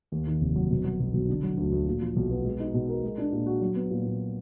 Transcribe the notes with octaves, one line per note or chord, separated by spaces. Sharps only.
D#2
D#3
F1
F#3
B2
F#3
B1
B1
D3
F#3
D2
D2
A#2
F3
B1
B3
G#3
D#4
B2
A#4
G#3
D4
A#2
F#4
F#3
B3
A#2
A#2